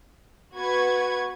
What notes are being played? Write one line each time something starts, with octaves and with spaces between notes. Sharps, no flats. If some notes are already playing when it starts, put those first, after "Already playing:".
B3 F#4 B4 F#5 C#6 G#6